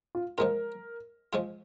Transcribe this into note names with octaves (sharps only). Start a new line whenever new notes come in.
F4
F3 G#3 F4 A#4
F3 G#3 F4